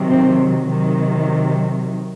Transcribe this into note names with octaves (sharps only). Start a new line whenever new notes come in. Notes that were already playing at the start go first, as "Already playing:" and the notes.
Already playing: C3 D#3 F#3
C4
C3 D#3 F#3